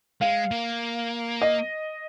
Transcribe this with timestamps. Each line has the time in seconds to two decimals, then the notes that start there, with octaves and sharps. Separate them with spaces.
0.21 G#3 F5
0.51 A#3
1.42 D#5